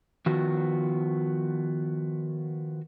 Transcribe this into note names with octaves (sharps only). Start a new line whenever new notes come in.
D#3 F3 B3 F#4